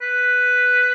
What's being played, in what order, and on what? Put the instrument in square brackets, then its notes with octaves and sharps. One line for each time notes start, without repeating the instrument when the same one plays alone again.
[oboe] B4